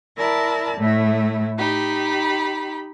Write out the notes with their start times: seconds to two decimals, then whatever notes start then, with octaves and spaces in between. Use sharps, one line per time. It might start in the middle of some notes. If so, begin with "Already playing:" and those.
0.16 E4 A#4 D5 A5
0.78 A2 A3 E4
1.57 D#4 G4 B5